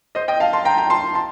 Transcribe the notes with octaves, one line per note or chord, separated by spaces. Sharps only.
C5 D#5
D#5 G5
F5 A5
A5 C6
G5 A#5
G5 A#5
A5 C6
A5 C6